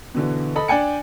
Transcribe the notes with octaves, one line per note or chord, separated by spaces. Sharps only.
B2 D3 E3
A4 D#5 B5
D4 D5 G5 G#5 C#7